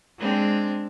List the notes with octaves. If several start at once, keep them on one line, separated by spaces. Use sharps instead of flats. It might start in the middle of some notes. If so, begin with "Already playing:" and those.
G#3 C4 D4